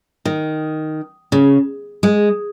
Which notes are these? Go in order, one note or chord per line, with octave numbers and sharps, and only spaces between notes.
D#3
C#3
G#3